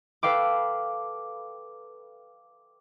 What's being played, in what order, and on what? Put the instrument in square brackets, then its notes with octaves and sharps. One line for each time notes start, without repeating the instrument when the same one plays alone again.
[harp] A4 B4 F5 G5 D6